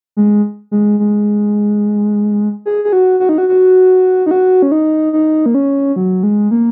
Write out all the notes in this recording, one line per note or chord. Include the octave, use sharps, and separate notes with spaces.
G#3
G#3
G#3
G#4
G#4
F#4
F#4
D#4
F#4
F#4
D#4
F#4
C#4
D#4
D#4
A#3
C#4
F#3
G#3
A#3